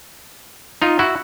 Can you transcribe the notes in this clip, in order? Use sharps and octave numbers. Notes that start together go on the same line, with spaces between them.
D#4 F4
E4 F#4